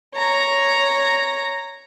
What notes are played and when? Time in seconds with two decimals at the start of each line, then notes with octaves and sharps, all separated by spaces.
0.15 C#5 A#5